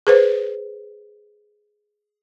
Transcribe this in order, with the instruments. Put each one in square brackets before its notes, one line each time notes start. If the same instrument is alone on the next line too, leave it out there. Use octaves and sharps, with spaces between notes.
[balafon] G#4 B4 C5